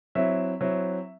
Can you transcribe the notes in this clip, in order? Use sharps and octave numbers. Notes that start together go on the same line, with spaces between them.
F#3 C4 E4 E5
F#3 C4 E4